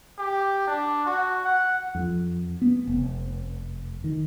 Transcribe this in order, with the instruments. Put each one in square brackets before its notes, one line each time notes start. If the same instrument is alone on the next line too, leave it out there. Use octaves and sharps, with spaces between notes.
[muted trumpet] G4
D4
F#4
F#5
[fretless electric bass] F2
B3
F1
D#3